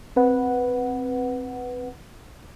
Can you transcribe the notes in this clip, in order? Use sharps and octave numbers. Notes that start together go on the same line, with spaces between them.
C4 B4 F#5